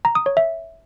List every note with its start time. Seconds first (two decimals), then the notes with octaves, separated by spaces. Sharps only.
0.05 A#5
0.15 D#6
0.26 C#5
0.37 E5